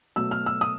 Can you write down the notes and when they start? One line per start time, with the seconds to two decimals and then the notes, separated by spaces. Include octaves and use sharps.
0.16 B2 F#3 A3 E6
0.31 F6
0.46 E6
0.61 D#6